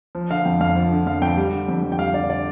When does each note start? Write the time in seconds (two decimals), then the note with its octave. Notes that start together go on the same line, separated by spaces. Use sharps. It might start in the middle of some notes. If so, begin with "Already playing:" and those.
0.15 F3
0.30 D3 F5
0.45 F2 G5
0.61 F2 F5
0.76 F3
0.92 D3
1.07 F2 F5
1.22 F2 G5
1.37 G3
1.53 D3
1.68 F2
1.83 F2
1.92 G5
1.99 G3 F5
2.14 D3 D5
2.30 D5